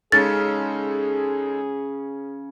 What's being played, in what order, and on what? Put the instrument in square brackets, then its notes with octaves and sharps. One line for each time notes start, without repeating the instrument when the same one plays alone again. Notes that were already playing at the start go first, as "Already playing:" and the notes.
[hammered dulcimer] C#3 C#4 [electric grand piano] G#3 D#4 A4 [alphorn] G#4 [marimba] A6